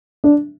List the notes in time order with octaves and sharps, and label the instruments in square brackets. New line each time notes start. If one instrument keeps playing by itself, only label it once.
[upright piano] D4